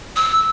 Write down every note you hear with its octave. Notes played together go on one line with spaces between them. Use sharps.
E6